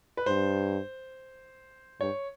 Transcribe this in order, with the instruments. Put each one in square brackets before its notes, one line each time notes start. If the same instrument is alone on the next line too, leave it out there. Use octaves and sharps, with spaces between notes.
[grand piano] B4
[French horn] G2 [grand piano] C5
[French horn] G2 [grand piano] C#5